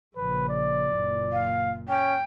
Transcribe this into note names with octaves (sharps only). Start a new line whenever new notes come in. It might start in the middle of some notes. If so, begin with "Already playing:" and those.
A#1 C#3 B4
D5
F#1 A#2
F5
C#4 G5